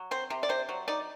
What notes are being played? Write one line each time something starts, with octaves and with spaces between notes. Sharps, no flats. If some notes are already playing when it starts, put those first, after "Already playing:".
Already playing: F#3
C4 C5
C3
D5
C3 C5
F#3
D#4 D5